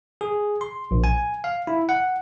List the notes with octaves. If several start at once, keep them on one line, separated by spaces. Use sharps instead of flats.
G#4
C6
A#1
G#5
F5
E4
F#5